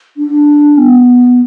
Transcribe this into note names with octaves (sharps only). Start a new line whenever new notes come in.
D4
B3